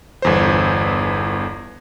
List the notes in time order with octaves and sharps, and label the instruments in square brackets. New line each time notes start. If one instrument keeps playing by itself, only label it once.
[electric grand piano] G1 E2 C5